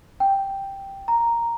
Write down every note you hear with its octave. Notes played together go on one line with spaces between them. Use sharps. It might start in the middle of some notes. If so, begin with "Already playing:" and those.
G5
A#5